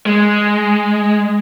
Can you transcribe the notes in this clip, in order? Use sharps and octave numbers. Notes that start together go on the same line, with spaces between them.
G#3